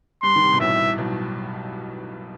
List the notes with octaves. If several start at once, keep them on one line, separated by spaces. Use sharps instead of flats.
G2 C6
D#3
C3
B2
A1 A2 E5
B1 B2